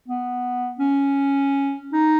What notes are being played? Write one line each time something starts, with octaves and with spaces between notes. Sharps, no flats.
B3
C#4
D#4